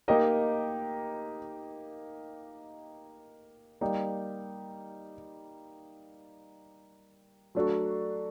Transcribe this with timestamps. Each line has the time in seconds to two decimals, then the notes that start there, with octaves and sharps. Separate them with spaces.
0.08 A#3 D#4 G4 A#4 D#5
3.81 G3 A#3 D#4 G4
7.55 F#3 A3 D4 F#4 A4